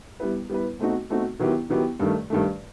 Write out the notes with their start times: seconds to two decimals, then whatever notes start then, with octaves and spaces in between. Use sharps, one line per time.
0.20 G3 B3 E4 B4
0.50 G3 B3 E4 B4
0.79 B2 A3 C4 D#4 F#4
1.10 B2 A3 C4 D#4 F#4
1.39 D#3 F#3 B3 E4 G4
1.70 D#3 F#3 B3 E4 G4
1.99 G2 D#3 A3
2.30 G2 D#3 A3